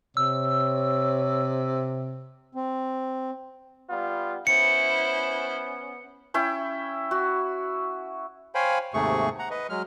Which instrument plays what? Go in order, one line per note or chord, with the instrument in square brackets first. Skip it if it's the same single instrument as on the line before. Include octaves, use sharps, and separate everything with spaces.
[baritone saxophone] C3 [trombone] C#5 [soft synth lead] E6
[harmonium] C4
[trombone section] G3 B3 F4
[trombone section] B3 C#4 [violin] E4 C5 [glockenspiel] C#7
[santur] C#4 E4 C#5 G5
F#4
[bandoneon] C5 C#5 F5 G5 G#5 B5
D#2 G#2 C3 A3 G#4 C#6
F#5 A#5
B4 D#5
F#3 G#3 F6